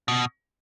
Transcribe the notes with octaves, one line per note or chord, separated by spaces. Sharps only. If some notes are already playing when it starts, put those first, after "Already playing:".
B2